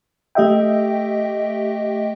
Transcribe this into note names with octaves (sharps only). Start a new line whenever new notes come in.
A3 G4 D#5 E5 G5